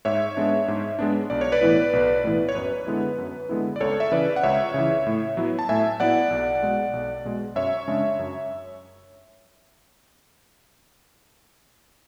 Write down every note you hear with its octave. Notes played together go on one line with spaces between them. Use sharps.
G#2 C#5 E5
G#3 B3 D4
G#2
G#3 B3 D4
B1 D5
C#5
B4 D5
A2 E3 B3 E4
B1
A2 E3 B3 E4
C#5
F#2 B4
D3 G#3 B3 E4
F#2
D3 G#3 B3 E4
D5
C#2 A4 C#5
E5
C#3 E3 B4 D5
F#5
C#2 C#5 E5
C#3 E3
A2
F#3 B3 E4
A5
A2 E5 G#5
F#3 B3 E4 D5 F#5
B1
B2 G#3
B1
B2 G#3
F#2 C#5 E5
C#3 G#3 D4
F#2